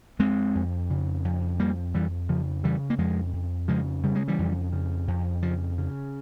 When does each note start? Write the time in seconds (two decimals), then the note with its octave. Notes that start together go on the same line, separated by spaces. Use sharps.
0.19 F2 G#3 C4
0.55 F2
0.90 C#3
1.25 F2
1.59 F2 G3 A#3
1.94 F2 E3 G3
2.29 C#3 F3
2.63 C#3 E3 G3
2.90 A#3
2.98 F2 F3 G#3
3.33 F2
3.68 C#3 F3 G#3
4.03 C#3 G3
4.15 G#3
4.28 E3 G3
4.39 F2
4.73 C#3
5.08 F2
5.42 C#3 F3
5.78 C#3